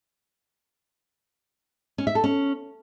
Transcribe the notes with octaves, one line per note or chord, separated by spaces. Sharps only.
C#4
E5
A4
C#4